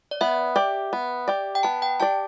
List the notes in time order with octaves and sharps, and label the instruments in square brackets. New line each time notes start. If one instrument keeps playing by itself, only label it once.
[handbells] D5
[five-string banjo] B3 [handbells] E5
[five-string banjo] G4 D5
B3
G4 D5
[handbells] G5
[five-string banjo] B3 [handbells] A5
[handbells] G5
[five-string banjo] G4 D5 [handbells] A5